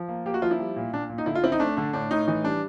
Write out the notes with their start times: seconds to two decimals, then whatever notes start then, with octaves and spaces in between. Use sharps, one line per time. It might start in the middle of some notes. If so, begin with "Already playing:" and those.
Already playing: F3
0.09 A#3
0.26 A#3 G4
0.34 F#4
0.42 F3 F4
0.51 E4
0.59 G3
0.76 A#2
0.93 A#2 D4
1.10 A#2
1.18 D#4
1.26 D3 E4
1.35 F4
1.44 C4 E4
1.52 D#4
1.60 A3 D4
1.77 D3 D4
1.93 A2 D4
2.11 A2 D#4
2.28 E3 D#4
2.44 G3 D4